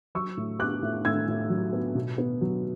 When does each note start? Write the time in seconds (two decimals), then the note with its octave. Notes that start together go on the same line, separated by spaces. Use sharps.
0.15 F#3 C#6 E6
0.37 A2
0.59 B3 D6 F#6
0.82 A2
1.05 A2 E6 G#6
1.28 A2
1.50 F#3
1.73 B3
1.95 B2
2.18 B3
2.41 F#3